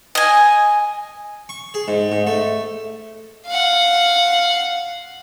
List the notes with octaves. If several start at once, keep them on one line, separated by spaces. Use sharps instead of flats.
D#5 G#5
C#6
G#4
G#2
G#2
A3
F5 F#5